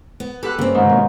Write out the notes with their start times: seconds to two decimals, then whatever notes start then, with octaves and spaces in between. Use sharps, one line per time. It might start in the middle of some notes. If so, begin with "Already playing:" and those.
0.20 B3
0.43 G4 A4 B4 F#6
0.59 G2 C#3 A#3 C4
0.75 G#2 D#3
0.90 B2 A#3 C#4